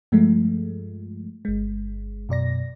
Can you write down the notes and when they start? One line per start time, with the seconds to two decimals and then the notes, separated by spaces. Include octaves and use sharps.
0.12 G2 F3 G#3 A3
1.45 G1 G#3
2.29 F#2 B2 D5 A#6